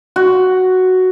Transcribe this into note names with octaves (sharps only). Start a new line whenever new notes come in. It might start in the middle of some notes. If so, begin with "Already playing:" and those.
F#4